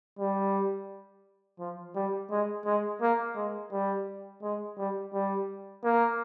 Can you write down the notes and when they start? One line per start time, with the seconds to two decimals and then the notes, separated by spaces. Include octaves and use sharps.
0.19 G3
1.59 F3
1.96 G3
2.31 G#3
2.66 G#3
3.02 A#3
3.36 G#3
3.72 G3
4.43 G#3
4.78 G3
5.13 G3
5.84 A#3